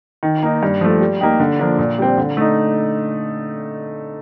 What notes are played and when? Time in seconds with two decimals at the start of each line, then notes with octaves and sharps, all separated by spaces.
0.23 D#3
0.43 A#3 D#4
0.63 G2
0.81 F3 A3
1.01 G3
1.21 A#3 D#4 G4
1.40 D3
1.59 F3 A#3 D4
1.78 A#2
1.98 G3 C4
2.18 D3
2.37 A3 D#4